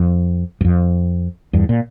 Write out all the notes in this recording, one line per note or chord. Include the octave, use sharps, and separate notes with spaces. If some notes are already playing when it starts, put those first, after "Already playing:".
Already playing: F2
G2
F2
E2 G2
A#2